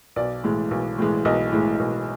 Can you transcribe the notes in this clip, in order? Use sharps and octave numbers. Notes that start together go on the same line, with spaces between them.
B1 D5
A2 E3 G#3
B1
A2 E3 G#3
B1 D#5
A2 E3 G#3
B1